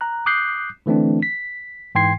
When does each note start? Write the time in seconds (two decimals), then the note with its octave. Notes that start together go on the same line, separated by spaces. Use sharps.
0.01 A#5 F#6
0.26 D6 D#6 F#6 G6 C7
0.86 D3 E3 A3 C4 D4
1.23 B6
1.95 G#2 E3 G5 C6 G#6 C7